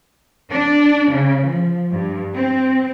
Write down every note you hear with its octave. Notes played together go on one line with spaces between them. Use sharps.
D4
C#3
F3
G2
C4